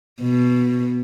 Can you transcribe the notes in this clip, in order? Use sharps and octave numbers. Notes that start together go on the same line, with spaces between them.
B2